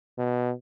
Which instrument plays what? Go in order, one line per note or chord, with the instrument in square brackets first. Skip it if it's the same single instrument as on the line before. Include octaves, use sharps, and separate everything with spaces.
[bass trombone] B2